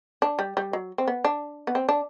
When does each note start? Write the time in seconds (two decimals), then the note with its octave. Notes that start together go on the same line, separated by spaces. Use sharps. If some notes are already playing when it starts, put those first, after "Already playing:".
0.22 D4
0.39 G3
0.57 G3
0.73 F#3
0.98 C4
1.07 B3
1.24 D4
1.67 B3
1.75 C4
1.89 D4